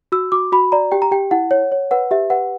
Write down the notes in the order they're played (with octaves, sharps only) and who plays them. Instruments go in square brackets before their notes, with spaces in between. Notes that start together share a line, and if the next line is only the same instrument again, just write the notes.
[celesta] F#4 E6
F#4 D6
F#4 B5
D5 A#5
G4 G5
A#5
G4 G5
E4 F#5
C#5
C#5
B4 F#5
G4 E5
B4 F#5